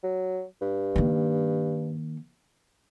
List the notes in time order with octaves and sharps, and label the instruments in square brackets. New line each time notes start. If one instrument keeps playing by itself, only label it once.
[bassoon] F#3
G2
[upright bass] D#3 A#3